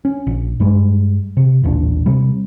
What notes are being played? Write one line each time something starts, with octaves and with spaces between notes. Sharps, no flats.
C#4
A#1
G2 G3 G#3
C3
A1 D#2 A#2 D4
C3 G3